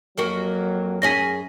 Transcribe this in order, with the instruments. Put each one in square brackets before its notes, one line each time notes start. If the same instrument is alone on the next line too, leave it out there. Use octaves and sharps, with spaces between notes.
[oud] F2 A#3 F#4 [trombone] F#3
[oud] F#2 C#4 G#4 [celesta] A#6 B6